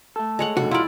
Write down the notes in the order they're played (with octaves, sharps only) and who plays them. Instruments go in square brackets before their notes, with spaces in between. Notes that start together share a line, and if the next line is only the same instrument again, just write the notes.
[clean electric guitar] A3 A4
[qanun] G#3 C#5 F#5 [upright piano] D#5
[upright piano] F1 B1 D3 [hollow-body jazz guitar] F#4
[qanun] E4 D5 [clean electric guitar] F4 [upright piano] F#5 A#5 F6